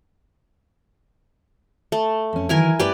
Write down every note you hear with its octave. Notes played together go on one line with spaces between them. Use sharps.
A3
F2 C#4
D#3 E3 F#3 E4 A#4 G#5
G2 A3 C#4 G4 B4 D5